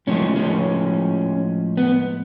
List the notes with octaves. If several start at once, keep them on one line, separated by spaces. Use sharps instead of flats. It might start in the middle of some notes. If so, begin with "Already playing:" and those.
A2 F3 G#3 C#4
C#4
B3